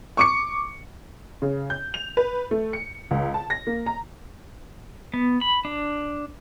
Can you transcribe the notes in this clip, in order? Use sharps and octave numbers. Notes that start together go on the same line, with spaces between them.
C#6 D6 C#7
C#3
G6
F7
B4
A3
C#7
C#2
A5
A#6
A#3
A#5
B3
B5
D4